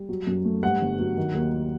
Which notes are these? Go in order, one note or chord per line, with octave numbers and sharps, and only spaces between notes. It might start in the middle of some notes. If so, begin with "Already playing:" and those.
Already playing: G3
F#3
F#2
A3
G2 F#5
G1
F#3
D#3
D#2
F#3